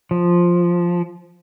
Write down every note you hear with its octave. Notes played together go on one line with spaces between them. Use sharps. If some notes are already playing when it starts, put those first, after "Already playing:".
F3